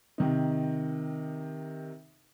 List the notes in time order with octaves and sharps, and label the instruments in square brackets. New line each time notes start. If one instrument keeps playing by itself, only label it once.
[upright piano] C3 D#3 D#4